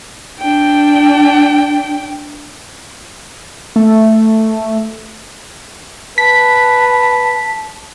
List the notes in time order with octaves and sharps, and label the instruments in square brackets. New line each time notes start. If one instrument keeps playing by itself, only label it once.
[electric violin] D4 G5
[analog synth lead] A3
[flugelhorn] B4 [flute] A5 [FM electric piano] B6